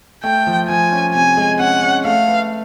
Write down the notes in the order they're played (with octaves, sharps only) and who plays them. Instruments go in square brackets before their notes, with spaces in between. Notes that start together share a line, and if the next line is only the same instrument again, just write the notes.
[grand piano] A3 [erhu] G5
[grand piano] F3
[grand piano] F3 [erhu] G#5
[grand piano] C#4
[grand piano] C3 [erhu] G#5
[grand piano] G#3
[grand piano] C#4 [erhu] F#5
[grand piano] C#4
[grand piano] A3 [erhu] F5
[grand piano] B4